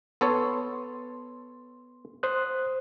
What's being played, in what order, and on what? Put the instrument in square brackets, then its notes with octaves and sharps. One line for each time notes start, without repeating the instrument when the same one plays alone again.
[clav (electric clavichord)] B3 A4 C#5 [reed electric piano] C6
[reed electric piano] C5 D#6 F#6